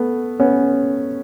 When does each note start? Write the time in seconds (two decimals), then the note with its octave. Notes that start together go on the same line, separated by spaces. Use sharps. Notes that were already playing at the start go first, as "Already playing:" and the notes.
Already playing: A3 B3
0.40 B3 C#4